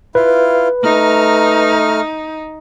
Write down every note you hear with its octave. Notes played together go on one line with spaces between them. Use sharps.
E4 F4 B4 F5
A3 D#4 A#5 F6